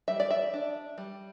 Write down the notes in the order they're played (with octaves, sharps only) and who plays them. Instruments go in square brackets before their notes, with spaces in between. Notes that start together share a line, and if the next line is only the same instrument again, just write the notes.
[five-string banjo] G3 E5
D5
E5
D4
G3